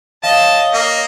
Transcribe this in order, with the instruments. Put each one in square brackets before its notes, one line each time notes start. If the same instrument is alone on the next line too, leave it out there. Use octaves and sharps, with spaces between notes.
[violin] C#5 D#5 [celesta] F5 [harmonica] A5
[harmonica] A#3